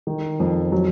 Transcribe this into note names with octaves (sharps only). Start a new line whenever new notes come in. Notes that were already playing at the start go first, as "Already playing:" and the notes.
D#3
F2
F#3